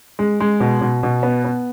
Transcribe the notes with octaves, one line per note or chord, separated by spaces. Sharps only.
G#3
G#3
B2
B2
B2
B3
B3